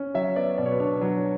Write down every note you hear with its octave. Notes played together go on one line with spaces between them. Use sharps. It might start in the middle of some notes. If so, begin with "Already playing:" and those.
Already playing: C#4
F#3 E5
B3 D5
B2 D5
C#5
B4
D4 C#5
F#3